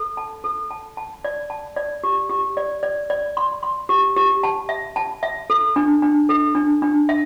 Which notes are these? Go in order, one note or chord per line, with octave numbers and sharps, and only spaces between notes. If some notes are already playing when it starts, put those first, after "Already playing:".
Already playing: A4
A5
A4
A5
A5
D5
A5
D5
G4
G4
D5
D5
D5
C6
C6
G4
G4
A5
E5
A5
E5
A4
D4
D4
A4
D4
D4
E5